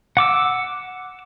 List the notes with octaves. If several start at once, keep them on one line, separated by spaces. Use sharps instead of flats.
F#5 D6 E6